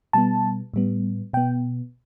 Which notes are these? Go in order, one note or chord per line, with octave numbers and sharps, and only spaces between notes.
B2 G3 B3 A5
A2 G3 B3
B2 B3 G5